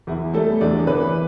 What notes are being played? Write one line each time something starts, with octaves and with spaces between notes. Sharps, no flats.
E2 E4
G3 A3 A4
E2 D4 D5
E3 B3 B4